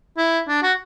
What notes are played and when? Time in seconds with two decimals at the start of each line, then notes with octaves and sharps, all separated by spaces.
0.17 E4
0.48 D4
0.62 F#4